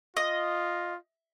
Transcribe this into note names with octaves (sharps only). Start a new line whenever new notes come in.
F4 D#5